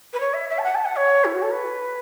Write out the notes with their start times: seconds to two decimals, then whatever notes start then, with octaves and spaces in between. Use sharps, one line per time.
0.13 B4
0.20 C#5
0.33 E5
0.49 E5
0.58 A5
0.63 F#5
0.75 A5
0.85 F#5
0.96 C#5
1.24 E4
1.34 F#4
1.42 A4
1.51 B4